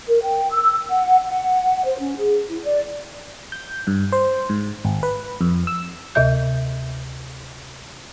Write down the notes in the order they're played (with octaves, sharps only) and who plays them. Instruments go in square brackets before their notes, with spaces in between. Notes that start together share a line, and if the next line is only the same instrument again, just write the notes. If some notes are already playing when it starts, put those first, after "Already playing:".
[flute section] A#4
G5
E6
F#5
F#5
C5
C#4
G#4
E4
D5
[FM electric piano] G6
G2
C5
G#2
G#1
B4
F2
E6
[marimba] D2 C3 D#5 E5 G6